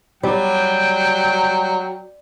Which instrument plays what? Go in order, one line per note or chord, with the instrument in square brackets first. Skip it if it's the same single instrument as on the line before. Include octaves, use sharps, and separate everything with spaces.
[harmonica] F#3 [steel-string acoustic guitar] G3 [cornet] G5